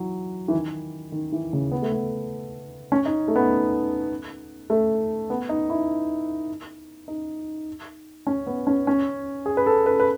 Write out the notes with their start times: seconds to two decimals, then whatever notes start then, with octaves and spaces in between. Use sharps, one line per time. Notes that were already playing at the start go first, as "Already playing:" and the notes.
Already playing: E3 F#3
0.48 E3
0.53 D#3
1.12 D#3
1.32 E3
1.53 C#3
1.72 B3
1.82 A3
1.92 B3
2.92 C#4
3.06 D#4
3.28 A3
3.36 B3
4.70 A3
5.30 B3
5.49 D#4
5.70 E4
7.08 D#4
8.27 C#4
8.47 B3
8.67 C#4
8.87 C#4
9.46 G#4
9.57 B4
9.66 A4
9.86 B4
10.00 B4